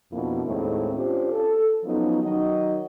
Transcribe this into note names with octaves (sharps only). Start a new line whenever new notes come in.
F2 B2 A#3 D4 E4
D#2 A2 G#3 C4 D4
C#4 D4 F4 G4 C5
A4
F3 F#3 B3 C#4 D#4
D#3 F#3 D#4 A#4 D#5